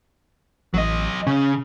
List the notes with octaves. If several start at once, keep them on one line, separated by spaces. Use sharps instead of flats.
A1 F#3 D#5
C#3 C#4